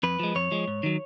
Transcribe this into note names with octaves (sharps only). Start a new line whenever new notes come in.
F2 B4
F3 G#3
F2 C#5
F3 G#3
G#2
D#3 F#3